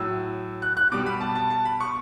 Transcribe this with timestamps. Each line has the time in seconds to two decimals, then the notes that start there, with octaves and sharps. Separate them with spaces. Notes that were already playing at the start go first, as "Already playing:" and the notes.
Already playing: A2 F#3 E6
0.62 F#6
0.77 F#6
0.92 B2 G3 D6
1.06 B5
1.21 A5
1.35 A5
1.50 A5
1.65 B5
1.80 C#6